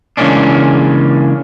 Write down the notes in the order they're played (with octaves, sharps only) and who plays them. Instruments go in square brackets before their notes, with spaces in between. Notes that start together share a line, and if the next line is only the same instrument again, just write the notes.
[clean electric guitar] C#3 E3 G#3 A#3 C#4 D4